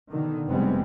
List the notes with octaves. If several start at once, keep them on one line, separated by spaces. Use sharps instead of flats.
B2 D3 D#3
F1 G3 G#3 B3 C4